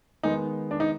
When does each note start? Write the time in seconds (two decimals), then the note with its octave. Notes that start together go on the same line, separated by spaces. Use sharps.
0.23 D#3 G#3 B3 D#4
0.71 D4
0.80 D#4